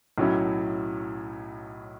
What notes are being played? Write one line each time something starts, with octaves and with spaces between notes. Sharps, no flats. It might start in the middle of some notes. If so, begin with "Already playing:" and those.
B1 A2 F#3 C#4 E4